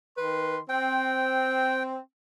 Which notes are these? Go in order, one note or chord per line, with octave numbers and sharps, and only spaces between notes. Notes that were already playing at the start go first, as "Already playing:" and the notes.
D#3 B4 C6
C4 G5